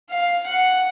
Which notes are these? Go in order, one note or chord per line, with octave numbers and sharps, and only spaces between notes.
F5
F#5